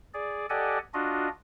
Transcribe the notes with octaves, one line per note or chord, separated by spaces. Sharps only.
G#4 D5
G4 A4 D5 D#5 F#5 G#5
D4 F4 F#4 D#5